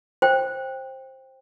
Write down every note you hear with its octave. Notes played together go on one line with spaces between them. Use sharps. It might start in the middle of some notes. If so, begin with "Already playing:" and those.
C5 G5